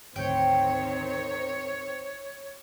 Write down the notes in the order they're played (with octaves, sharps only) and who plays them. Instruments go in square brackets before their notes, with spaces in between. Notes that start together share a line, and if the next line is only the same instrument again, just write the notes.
[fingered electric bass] G#1 D2 [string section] D#3 C4 [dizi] C#5 [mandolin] G5